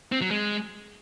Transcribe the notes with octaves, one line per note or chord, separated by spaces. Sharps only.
C4
F#3
G#3